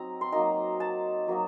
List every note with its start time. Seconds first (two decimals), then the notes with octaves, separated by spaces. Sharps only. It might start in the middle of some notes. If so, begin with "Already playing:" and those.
Already playing: F#3 C4 D#4 A#5
0.21 C6
0.32 F#3 A#3 D#4 A#5
0.80 A5
1.28 F#3 A#3 D#4